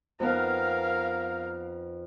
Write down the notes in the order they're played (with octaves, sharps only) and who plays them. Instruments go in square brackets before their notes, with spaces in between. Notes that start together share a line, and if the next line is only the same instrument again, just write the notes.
[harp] F2 B3 D#4 [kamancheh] A#4 F5